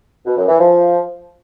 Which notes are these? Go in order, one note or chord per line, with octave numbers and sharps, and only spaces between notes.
B2
F#2
E3
F3